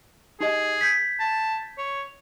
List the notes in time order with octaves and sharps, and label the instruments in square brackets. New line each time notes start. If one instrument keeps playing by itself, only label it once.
[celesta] D#4 G4 D#5 [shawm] G#4
[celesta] G6 G#6 B6
[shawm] A5
C#5